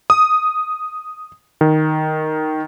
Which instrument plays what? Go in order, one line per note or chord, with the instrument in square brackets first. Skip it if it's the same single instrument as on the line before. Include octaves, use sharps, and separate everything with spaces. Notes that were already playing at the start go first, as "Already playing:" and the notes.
[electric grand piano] D#6
D#3